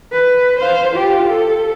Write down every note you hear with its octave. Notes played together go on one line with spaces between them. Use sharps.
B4
C5 F5
F4 G4
A4